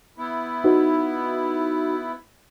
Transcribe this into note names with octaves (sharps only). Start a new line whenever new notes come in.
B3 E4
D#4 F#4 B4